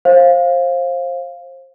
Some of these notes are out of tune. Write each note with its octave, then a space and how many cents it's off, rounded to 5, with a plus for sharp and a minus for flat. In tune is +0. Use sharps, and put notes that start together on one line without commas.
C5 +25 F5 +0